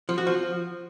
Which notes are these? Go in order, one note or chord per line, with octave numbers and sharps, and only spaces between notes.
F3
F#4
F3